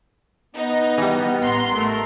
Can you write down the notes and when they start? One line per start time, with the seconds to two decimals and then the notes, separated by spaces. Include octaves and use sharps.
0.55 B3 D#4
0.98 E3 G3
1.42 A1 A#5 C6
1.73 A3 A#4